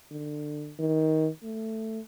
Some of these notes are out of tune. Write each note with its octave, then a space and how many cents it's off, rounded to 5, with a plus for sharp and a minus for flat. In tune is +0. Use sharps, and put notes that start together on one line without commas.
D3 +25
D#3 +20
A3 +10